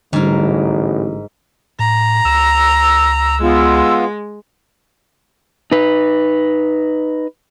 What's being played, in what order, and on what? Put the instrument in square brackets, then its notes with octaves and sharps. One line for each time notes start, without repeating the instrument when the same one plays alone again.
[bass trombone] A1 [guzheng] G#2 A#4 [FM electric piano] D3 G3
[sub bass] A2 [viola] A#5
[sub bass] C#2 [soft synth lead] E6
[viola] G#3 [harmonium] B3 F4
[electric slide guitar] D#4 B4